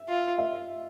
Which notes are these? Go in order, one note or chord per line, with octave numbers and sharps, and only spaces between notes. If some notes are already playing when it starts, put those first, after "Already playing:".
Already playing: E5
F4
E5